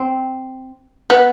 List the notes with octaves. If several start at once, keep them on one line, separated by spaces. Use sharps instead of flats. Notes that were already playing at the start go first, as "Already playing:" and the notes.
Already playing: C4
B3